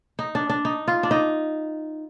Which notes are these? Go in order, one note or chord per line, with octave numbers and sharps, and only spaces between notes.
D#4
D4
D4
D#4
F4
D4
D#4